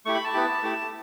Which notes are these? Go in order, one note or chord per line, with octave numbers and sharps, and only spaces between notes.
A3 E4 G4 C#6
B5
A5
B3 E4 G4
A3 E4 G4